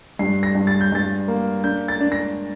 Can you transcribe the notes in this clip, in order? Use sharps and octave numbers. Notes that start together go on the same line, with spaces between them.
G2 C7
A#6
G2
A6
G6
G2 A6
A#3
D4 G6
A6
D4
A#6